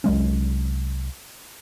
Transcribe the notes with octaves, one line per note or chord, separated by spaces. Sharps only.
C2 F#3 G#3 C#4